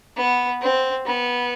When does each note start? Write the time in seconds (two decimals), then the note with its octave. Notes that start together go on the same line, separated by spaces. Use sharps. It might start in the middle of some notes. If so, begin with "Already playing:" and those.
0.17 B3
0.62 C4
1.05 B3